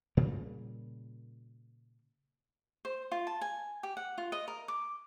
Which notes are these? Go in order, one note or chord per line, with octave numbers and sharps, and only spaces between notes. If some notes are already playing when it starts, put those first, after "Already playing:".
A#2 C#3 G3 A#3
C5
F4
A5
G#5
G4
F#5
F4
D#5
A#4
D6